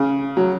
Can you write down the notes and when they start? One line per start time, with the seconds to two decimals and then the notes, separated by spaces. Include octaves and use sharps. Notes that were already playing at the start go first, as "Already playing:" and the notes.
Already playing: C#3
0.37 F#3